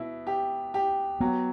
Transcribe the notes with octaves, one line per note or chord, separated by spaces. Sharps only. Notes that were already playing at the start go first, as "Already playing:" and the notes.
Already playing: B2 E4
G4
G4
F#3 B3